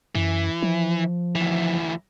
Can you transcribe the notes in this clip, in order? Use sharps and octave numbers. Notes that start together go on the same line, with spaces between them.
F#2 E3
F3
D2 E3